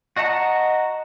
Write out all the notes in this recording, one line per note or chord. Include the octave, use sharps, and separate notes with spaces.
F#4 D#5 F#5 A5 A#5